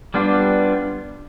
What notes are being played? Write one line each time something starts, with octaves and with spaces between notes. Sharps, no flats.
G3 B3 D4 F4